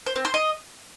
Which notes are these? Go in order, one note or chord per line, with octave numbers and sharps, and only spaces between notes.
C5
C4
C5
D#5